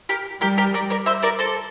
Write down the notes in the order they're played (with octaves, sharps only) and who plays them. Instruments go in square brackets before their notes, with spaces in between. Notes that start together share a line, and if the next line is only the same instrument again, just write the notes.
[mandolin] G4 A#4
[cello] G3 [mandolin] G4 A#4
[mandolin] G4 A#4
A#4 D5
A#4 D5
C5 E5
A#4 D5
A4 C5